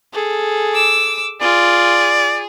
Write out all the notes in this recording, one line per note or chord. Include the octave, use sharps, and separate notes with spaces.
G#4 A4
D6 E6
F4 G#4 D5